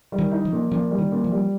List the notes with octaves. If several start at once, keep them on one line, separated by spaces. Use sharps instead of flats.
G3
D#3
D#4
F3
A#2
A#2 F3
G3
D#3
A#2
F3
G3